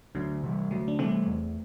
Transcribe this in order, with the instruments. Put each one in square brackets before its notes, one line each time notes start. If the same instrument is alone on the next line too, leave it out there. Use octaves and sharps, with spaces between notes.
[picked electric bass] D2 [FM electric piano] D3 F#3
[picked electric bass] C3 E3 G3
[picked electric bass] D2 [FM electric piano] F#3 A3
[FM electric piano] D4
[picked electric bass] C3 E3 G3 [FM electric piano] A3 C4
[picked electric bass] E2